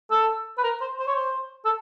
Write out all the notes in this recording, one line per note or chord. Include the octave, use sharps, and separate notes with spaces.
A4
B4
A#4
C5
C5
C#5
C5
A4